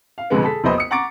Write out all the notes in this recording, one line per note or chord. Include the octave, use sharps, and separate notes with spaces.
F5
F2 B2 D3 G#3 B3
G#4 A4 B6
E1 A#1 B3 C5 D#5 B5
D#6 C#7
F#5 A#5 C#6 D6 A6 D7